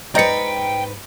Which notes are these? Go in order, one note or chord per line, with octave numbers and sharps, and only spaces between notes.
G#2 B4 C5 D5 D#5 G5 A#5 C#7